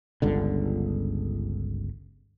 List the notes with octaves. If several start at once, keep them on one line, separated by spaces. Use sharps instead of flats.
G1 C#2 D3